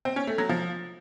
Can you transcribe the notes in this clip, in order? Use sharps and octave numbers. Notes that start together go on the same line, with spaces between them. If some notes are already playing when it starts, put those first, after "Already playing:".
C4
C#4
A3
F#3
F3